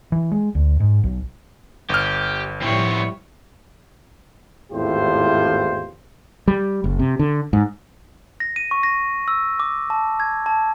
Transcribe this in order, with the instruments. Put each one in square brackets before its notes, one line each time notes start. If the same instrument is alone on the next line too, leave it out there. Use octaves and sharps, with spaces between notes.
[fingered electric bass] E3
G#3
D2
G#2
B1
[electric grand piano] G1 F6 [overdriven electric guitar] G4
[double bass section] A2 F3 G3 [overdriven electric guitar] B3 C4 [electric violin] E4 C#5
[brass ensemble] G#1 E2 A2 F4 G4 C5
[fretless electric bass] G3
F#1
C3
D3
G#2
[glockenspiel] A#6
D#7
C#6
A#6
E6
D6
A5
G#6
A5